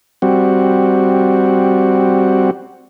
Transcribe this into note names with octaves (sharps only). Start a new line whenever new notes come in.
G3 C4 F#4